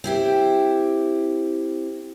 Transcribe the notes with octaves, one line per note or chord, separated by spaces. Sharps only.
C4 E4 G4